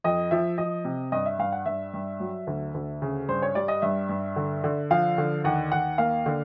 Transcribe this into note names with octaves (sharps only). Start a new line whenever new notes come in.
F2 D#5
F3 E5
F3 D#5
C3
G2 D#5
E5
G2 F5
F#5
G2 E5
G2
F#3
D2
D2
C#3
G2 C5
C#5
G3 D5
D#5
G2 E5
G2
D3
D3
F3 F5
D3
D#2 F#5
D#2 F#5
A#3 F5
D3